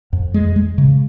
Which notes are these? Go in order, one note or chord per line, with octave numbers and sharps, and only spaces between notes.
F2
G#3
G#3
C#3